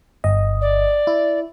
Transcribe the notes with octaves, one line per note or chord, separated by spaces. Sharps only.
G1 D#5
D5
E4